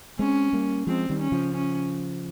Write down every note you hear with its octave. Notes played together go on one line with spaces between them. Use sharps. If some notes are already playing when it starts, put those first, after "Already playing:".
G#3 C4 C#4
G3 A#3
F3 G#3 C4
D#3 G3
C#4
C#3 F3
C#4